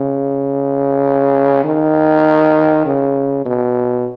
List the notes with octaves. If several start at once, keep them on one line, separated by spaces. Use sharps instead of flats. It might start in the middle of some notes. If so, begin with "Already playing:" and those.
Already playing: C#3
D#3
C#3
B2